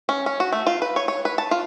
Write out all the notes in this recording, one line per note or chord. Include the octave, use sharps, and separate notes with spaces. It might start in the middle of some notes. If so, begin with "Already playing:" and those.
C#4
C#4
F#4
A3
F4
B4
C#5
C#5
B4
A5
F4